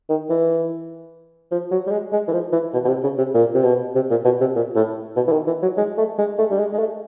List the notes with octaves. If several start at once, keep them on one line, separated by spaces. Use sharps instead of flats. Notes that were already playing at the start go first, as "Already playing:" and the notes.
D#3
E3
F3
F#3
G3
G#3
G#3
E3
F3
E3
B2
B2
C3
C#3
C3
A#2
C3
B2
C3
A#2
B2
C3
A#2
A2
B2
E3
D#3
E3
F#3
G#3
A3
G#3
A3
G3
G#3
G#3
A3